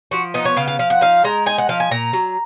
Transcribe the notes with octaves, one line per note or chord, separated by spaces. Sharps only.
F3 F#4
B3 D#4
C#5
C#3 F5
F5
F3 F5
F#5
D#4 F5
G#3 A#5
D#4 G#5
F#5
F3 F5
G#5
A#2 A#5
F#3